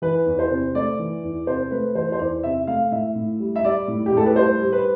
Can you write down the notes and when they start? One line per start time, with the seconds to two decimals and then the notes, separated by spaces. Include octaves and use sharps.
0.02 E3 B4
0.26 E2
0.39 C5
0.50 C3
0.75 A3 D5
0.99 E3
1.23 E2
1.47 C3 C5
1.71 A3 B4
1.95 E3 C5
2.12 C5
2.19 E2 D5
2.43 C3 E5
2.67 A3 F5
2.91 A2 E5
3.15 A2
3.40 G3
3.56 E5
3.64 G3 D5
3.88 A2
4.06 G4
4.13 A2 A4
4.26 B4
4.36 G3 C5
4.61 G3
4.72 B4